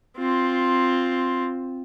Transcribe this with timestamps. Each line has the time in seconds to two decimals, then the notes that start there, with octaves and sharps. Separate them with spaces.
0.18 C4 F4